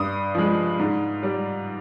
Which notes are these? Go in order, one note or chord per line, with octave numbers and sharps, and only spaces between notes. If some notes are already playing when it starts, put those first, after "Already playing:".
Already playing: G2 D#6
F3 G#3
G#2
G3